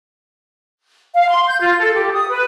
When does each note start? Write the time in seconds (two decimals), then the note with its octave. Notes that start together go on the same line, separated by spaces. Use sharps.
1.14 F5
1.30 C6
1.47 G6
1.60 F4
1.78 A4
1.94 G4
2.13 D#6
2.30 B4